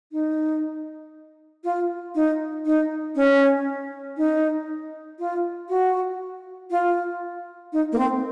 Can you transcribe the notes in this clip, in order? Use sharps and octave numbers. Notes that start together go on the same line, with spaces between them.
D#4
F4
D#4
D#4
C#4
D#4
F4
F#4
F4
D#4
A#3
C4